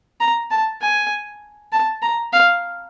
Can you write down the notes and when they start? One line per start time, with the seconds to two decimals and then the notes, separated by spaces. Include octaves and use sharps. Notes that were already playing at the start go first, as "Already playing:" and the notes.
0.20 A#5
0.51 A5
0.81 G#5
1.72 A5
2.02 A#5
2.33 F5